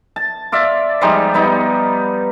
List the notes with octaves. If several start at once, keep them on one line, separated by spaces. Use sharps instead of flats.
A5
F4 D5 E5
F3 G3 G#3 D#4
G3 B3 D#4